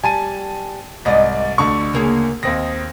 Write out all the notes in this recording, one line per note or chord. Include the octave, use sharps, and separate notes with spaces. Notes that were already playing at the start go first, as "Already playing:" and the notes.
G3 G#5 A5 D#7
C2 G#2 D5 D#5
D2 D3 D4 C#6
C#3 A#3 G#4
D#2 D#3 C4 A#6